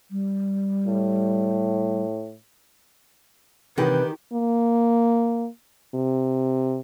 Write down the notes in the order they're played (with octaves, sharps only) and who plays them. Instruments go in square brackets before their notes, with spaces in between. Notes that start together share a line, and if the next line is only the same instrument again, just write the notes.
[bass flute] G3
[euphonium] A2
[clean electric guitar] C3 E3 [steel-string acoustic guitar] D#3 G4 [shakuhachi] B4
[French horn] A#3
C3